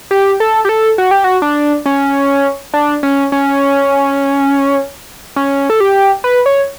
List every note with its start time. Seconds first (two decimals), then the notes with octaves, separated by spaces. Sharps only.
0.11 G4
0.40 A4
0.65 G4
0.69 A4
0.98 F#4
1.11 G4
1.24 F#4
1.42 D4
1.86 C#4
2.74 D4
3.03 C#4
3.32 C#4
5.36 C#4
5.70 A4
5.80 G4
6.24 B4
6.46 C#5